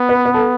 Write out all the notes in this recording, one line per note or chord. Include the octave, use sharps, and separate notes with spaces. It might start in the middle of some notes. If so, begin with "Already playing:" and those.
Already playing: B3
B4
B4
A4